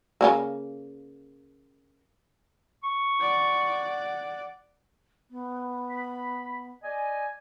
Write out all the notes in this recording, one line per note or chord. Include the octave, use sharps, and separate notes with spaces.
C#3 G#3 A#3
C#6
D5 F#5
B3
B5
D5 D#5 G#5